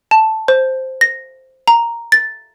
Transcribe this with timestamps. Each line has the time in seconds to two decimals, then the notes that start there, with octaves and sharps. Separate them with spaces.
0.11 A5
0.48 C5
1.01 A#6
1.68 A#5
2.12 A6